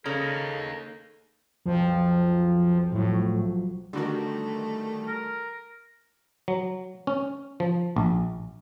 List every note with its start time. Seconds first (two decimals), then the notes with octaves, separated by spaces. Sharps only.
0.06 C#3 A#3 D#4 A4
1.66 B1 F2 F3
2.92 A2 F3 F#3
3.93 D3 D#3 G3 A3 F#4
5.08 A#4
6.48 F#3
7.07 C#4
7.60 F3
7.96 A#1